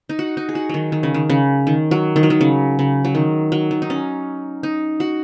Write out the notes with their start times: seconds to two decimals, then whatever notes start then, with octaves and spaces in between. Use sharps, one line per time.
0.09 D#4
0.19 F#4
0.37 D#4
0.49 G#4
0.55 F#4
0.69 D#3 F#3
0.92 D#3
1.03 C#3
1.14 D#3
1.30 C#3
1.67 D#3
1.91 F#3
2.16 D#3
2.23 F#3
2.30 D#3
2.41 C#3
2.79 C#3
3.05 F#3
3.15 D#3
3.52 F#3
3.71 D#3
3.82 D#4
3.90 C#4
4.63 D#4
5.00 F#4